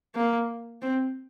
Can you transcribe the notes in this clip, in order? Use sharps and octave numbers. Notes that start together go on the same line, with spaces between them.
A#3
C4